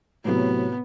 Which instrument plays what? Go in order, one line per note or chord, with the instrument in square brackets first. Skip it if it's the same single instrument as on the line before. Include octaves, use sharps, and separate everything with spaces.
[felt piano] A2 C3 F#3 [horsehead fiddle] B3